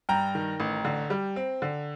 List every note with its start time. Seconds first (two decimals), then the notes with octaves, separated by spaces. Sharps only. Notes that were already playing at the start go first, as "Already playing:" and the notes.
0.09 G2 G5 A#5
0.35 D#3
0.60 A1
0.85 D3
1.10 G3
1.36 C4
1.62 D3